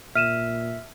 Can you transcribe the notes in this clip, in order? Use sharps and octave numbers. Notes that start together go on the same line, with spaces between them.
A#2 E5 F6 D#7 E7